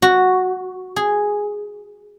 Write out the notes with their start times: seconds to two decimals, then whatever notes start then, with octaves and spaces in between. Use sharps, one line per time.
0.02 F#4
0.96 G#4